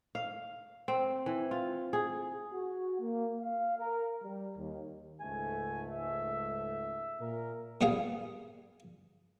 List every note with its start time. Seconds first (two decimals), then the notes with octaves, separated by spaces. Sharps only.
0.15 F5
0.88 C4
1.26 E3
1.51 F4
1.93 G#4
2.53 F#4
3.00 A#3
3.41 F5
3.78 A#4
4.23 G3
4.56 D#2
5.21 C#2 G#2 A3 G#5
5.93 E5
7.18 A#2 A#4
7.81 A#2 G3 B3 G#4 F5